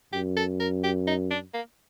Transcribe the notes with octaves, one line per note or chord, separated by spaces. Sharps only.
F#2 G4
A4
A#4
G4
D#4
D4
A#3